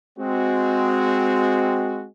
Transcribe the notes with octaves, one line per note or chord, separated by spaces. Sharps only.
G#3 C4 F#4